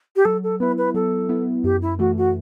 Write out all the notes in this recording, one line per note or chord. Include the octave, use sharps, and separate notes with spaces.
G4
F#3 A4
A4
B3 E4 B4
B4
F#3 A4
B3 E4
F#2 G4
E4
E3 A3 F#4
F#4